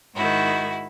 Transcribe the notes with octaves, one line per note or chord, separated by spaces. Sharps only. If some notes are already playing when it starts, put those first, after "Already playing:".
G#2 D#3 E4 F#4